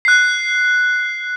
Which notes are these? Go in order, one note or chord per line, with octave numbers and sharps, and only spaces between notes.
F#6 C7